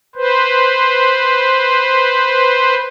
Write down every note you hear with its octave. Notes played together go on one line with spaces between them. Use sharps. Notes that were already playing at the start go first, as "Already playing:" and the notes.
B4 C5